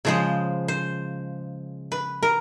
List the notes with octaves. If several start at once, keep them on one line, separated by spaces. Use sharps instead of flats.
C#3 F3 G#3 C5
C5
B4
A#4